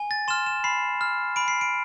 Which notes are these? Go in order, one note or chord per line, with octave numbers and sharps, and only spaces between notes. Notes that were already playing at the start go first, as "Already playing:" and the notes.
Already playing: G#5
A6
C6 F6 E7
E7
B5 C7
F6
B5 D7
C7
D7